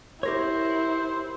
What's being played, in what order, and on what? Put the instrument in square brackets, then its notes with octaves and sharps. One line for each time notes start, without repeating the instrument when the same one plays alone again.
[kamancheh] E4 [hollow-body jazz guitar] G4 A#4 C#5 [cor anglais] C5